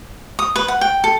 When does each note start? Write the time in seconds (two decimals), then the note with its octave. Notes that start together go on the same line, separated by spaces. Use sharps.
0.39 D#6
0.56 B4
0.68 F#5
0.81 G5
1.04 A4